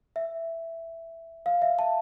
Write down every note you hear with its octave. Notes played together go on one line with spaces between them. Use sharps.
E5
F5
E5
A5